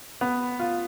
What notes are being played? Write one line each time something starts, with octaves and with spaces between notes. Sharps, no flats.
B3
F4